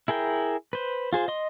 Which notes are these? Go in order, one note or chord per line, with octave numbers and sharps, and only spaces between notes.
E4 G#4 A#4 G5
B4 C5
F4 G#4 C5
D#5 C6